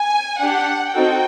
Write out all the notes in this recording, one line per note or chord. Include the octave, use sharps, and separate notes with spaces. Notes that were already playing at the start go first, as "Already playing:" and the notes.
Already playing: G#5
D4 G4 F#5
C4 D#4 F#4 A4 G5